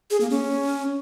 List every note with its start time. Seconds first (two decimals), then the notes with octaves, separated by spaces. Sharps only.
0.11 G#4
0.21 A#3
0.31 C#4